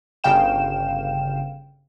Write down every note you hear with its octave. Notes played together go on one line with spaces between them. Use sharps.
G1 C#3 F5 G5 E7